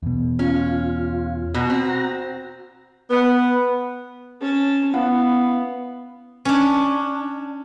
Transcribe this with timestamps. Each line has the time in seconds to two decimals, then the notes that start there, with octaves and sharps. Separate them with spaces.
0.03 E2 B2
0.39 C#4 F4
1.54 B2 F#4 A#5
1.70 C4
3.10 B3
4.41 C#4 A5
4.94 B3 E4 F5 F#5
6.45 C#4 D4